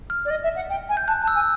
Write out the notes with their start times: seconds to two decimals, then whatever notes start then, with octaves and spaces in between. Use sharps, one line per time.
0.10 F6
0.25 D5
0.30 D#5
0.43 E5
0.55 F#5
0.69 G5
0.89 G#5
0.97 G6
1.07 A5 F#6
1.22 A5
1.28 E6
1.35 G#5